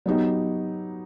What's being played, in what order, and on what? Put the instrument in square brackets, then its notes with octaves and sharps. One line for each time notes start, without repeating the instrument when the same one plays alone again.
[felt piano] F#3 B3 D#4 G4